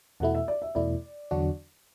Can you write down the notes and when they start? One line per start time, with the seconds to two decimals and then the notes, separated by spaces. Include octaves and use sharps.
0.20 E2 B2 A3 E4 F#5
0.35 E5
0.48 D5
0.62 E5
0.75 E2 B2 A3 E4 D5
1.31 E2 D3 F#3 D4 F#4